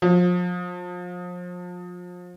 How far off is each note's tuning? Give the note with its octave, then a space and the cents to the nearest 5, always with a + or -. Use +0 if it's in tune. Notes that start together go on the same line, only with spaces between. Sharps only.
F3 +35